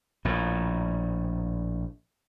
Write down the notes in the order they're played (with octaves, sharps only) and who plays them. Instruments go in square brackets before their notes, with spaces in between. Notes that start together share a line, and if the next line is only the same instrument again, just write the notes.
[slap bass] A#1 A2